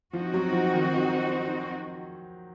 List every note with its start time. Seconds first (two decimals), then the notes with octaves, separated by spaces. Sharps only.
0.13 F3 C4 D#4 F#4
0.34 F#3
0.52 F3
0.73 D#3
0.93 F3